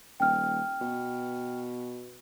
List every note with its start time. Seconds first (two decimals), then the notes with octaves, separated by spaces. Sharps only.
0.20 D#1 G5 F6
0.81 B2